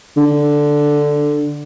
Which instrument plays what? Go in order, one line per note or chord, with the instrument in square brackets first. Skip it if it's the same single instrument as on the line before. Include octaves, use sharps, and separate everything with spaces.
[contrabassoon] D3